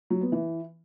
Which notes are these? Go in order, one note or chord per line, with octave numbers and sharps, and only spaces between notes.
F#3
B3
E3